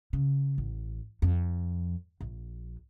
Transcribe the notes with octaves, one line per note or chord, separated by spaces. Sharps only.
C#3
A1
F2
A#1